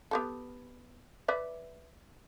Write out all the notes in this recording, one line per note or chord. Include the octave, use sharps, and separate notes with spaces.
B3 G4 A4
B4 D5 E5